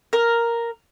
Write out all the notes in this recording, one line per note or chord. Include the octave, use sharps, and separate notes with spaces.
A#4